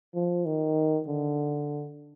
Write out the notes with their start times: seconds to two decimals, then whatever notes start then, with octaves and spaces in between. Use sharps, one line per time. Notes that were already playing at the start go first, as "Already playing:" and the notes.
0.15 F3
0.45 D#3
1.08 D3